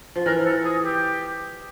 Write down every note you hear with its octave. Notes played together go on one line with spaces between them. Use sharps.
F3
E3 A#4
A4
G#4
G4